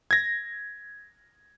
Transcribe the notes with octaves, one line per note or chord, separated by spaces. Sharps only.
G#6 A#6